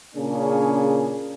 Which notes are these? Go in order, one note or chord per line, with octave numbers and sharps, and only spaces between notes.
A#2 C#3 A#3 C#4 D4 G#4